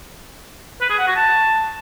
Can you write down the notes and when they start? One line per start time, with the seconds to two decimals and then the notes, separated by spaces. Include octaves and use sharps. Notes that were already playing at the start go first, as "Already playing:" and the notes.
0.81 B4
0.90 G#4
0.98 F#5
1.07 F#4
1.16 A5